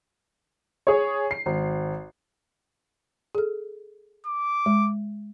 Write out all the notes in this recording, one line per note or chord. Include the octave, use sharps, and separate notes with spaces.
G#4 C#5
C7
G#1
G#4 A4
D6
G#3